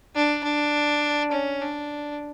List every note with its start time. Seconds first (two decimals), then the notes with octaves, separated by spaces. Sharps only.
0.15 D4
0.44 D4
1.32 C#4
1.61 D4